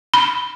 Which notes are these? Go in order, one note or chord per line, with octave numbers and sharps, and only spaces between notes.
B5